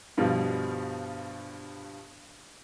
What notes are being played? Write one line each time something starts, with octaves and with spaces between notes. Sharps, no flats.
G2 B2 F3 G3